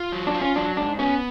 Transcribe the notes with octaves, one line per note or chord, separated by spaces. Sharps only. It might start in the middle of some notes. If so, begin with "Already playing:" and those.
Already playing: F4
F#3
D4
F4
C#4
F#3 D4
G#2 D4
B3 C#4